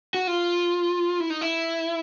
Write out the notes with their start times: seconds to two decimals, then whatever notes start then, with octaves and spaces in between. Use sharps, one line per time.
0.14 F#4
0.27 F4
1.20 E4
1.30 D#4
1.41 E4